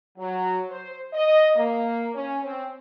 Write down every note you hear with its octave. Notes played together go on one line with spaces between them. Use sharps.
F#3
C5
D#5
A#3
C#4
C4